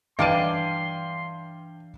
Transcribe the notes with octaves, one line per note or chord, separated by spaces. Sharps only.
G2 E3 D5 F5 A5 C6 F6 D#7